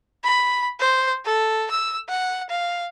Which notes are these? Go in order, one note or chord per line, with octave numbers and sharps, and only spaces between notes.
B5
C5
A4
E6
F#5
F5